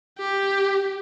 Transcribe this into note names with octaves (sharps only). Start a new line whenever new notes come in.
G4